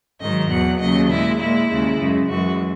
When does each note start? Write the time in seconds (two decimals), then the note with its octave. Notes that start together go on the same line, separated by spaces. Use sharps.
0.20 G#2 D#3 F#3 D#5
0.50 E2 B2 F#3 F#5
0.79 D#2 C#3 F#3 D#5
1.09 A#2 G#3 E4
1.39 A#2 G#3 E4
1.69 D#2 C#3 G#3
1.99 F#2 C#3 G#3
2.28 F#2 E3 G#3 F#4